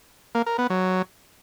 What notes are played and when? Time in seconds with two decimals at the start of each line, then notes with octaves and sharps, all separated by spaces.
0.35 A#3
0.46 A#4
0.58 B3
0.70 F#3